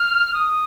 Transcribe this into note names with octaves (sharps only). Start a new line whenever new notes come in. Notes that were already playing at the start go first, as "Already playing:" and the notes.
Already playing: F6
D#6